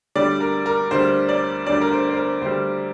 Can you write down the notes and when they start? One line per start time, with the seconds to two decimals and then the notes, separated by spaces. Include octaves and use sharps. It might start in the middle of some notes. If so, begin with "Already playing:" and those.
0.15 D2 D3 G3 D5
0.40 A#4
0.66 A#4
0.91 D2 D3 G3 C5
1.29 D5
1.66 D2 D3 G3 D5
1.81 A#4
1.91 C5
2.09 C5
2.17 A#4
2.42 D2 D3 G3 C5